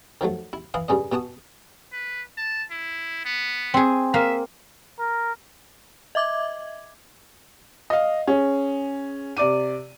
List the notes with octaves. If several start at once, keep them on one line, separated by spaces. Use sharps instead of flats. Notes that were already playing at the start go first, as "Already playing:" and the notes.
D#3 F3 F#3 A3
E4
E3 E4 F5 D#6
G2 C#3 C#4 D#5
B2 B3 F#4 A5 D#6
B4
A5
E4
B3
C4 G#4
A#3 E5 F5
A#4
D#5 E5 D6 G#6
D#5 F5
C#4 G#4
C3 D5 D6 D#7